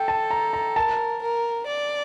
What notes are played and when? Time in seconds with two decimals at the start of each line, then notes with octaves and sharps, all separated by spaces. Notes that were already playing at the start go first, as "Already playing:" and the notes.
Already playing: A4 G5
0.08 A5
0.31 A#5
0.53 A#5
0.76 A#4 A5
1.22 A#4
1.67 D5